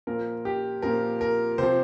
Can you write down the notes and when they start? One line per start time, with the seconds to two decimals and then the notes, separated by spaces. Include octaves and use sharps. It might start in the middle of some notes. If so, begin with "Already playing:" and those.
0.07 A#2 F3 A#4
0.45 G4
0.82 A#2 F3 A#4
1.21 A#4
1.58 C3 F3 C5